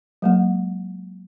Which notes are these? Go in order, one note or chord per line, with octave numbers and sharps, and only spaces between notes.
F#3 G#3 A#3